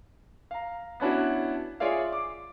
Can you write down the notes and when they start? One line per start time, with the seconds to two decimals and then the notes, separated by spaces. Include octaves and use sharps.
0.51 F5 A#5
1.00 B3 C#4 D4 E4 F#4
1.80 F4 G#4 C#5 D5 E5 F5
2.12 D6